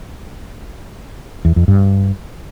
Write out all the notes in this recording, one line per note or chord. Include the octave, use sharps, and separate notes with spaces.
E2
F2
G2